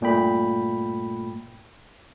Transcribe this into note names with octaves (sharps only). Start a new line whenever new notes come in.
G2 A#2 A3 G5 B5